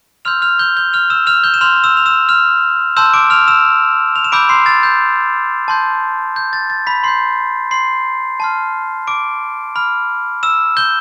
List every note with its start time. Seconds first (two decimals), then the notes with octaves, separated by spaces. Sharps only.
0.25 C6 E6 F6 G6 F7
0.42 F6 F7
0.59 G6 G7
0.77 G6 G7
0.93 F6 F7
1.10 E6 E7
1.27 F6 F7
1.44 G6 G7
1.54 E7
1.61 C6 F6 G6 F7
1.84 E6 E7
1.97 F7
2.06 E6 E7
2.29 F6 F7
2.97 A5 C6 E6 G6 E7
3.14 D6 D7
3.30 F6 F7
3.48 E6 E7
4.16 F7
4.24 E7
4.32 B5 D6 E6 G6 D7
4.49 C6 C7
4.66 A6
4.83 G6
5.68 A5 C6 G6
6.36 G6
6.53 A6
6.70 A6
6.87 B5 B6
7.04 C6 G6 C7
7.71 C6 C7
8.40 A5 C6 F6
9.07 D6 D7
9.76 B5 F6
10.43 E6 E7
10.77 G6 G7